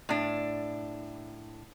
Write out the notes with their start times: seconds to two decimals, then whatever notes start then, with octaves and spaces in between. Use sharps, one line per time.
0.09 A2 D4